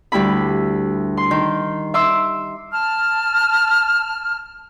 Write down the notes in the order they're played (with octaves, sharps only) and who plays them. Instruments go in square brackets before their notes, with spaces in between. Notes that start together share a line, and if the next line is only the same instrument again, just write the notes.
[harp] D2 G3 E4 B5
C6
D#3
E5 C6 D6 E6
[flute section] A5 F6